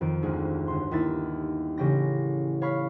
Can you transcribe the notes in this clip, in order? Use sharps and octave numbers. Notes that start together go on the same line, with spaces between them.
F2 D#3 D7
G#1 D2 G#4
G1 C6
D#2 D#4 E4 E5 A6
A1 C#3 G4 A#6
C#5 F5 B5 C#6 B6